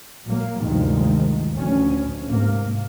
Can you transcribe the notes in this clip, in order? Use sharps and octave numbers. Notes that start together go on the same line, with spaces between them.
A#2 F#3 A#3
D2 G2 C3 D#3 F3 G#3
D2 F3 C#4
G#2 C3 A#3